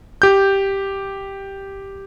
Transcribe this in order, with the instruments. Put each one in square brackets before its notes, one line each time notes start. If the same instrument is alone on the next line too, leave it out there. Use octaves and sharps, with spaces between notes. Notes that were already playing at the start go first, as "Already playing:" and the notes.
[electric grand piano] G4 G6